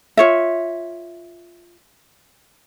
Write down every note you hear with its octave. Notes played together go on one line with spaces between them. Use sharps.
F4 C#5 E5